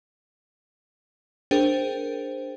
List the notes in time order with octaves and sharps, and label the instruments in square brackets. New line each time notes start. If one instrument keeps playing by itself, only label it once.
[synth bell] D4 G#4 A#4 C5 G5